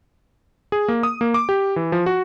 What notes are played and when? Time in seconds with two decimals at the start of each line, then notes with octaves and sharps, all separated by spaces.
0.72 G#4
0.88 A#3
1.03 D#6
1.21 A#3
1.34 D6
1.49 G4
1.76 E3
1.92 F3
2.06 F#4